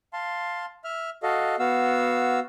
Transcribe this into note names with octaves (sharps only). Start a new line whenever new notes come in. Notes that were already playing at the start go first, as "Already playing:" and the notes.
F5 A5 C6
E5 F6
F#4 A4 D#5 F5
B3 F#4 F5 E6